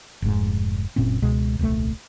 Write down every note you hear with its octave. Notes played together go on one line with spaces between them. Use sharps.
F1 G#2
F#1 A#2 C4 C#4
C#2 B2 G#3
D#1 C2 A3